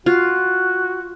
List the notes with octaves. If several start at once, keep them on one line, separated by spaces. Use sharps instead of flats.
F4 F#4